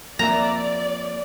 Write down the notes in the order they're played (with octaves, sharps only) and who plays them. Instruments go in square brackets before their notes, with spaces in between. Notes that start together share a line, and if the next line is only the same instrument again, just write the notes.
[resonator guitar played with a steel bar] F2 E5 [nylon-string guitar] A#3 [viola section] D5 [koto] A#5